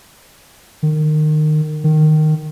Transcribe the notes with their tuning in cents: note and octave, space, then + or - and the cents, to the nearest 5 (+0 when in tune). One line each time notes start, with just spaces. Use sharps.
D#3 -25
D#3 -10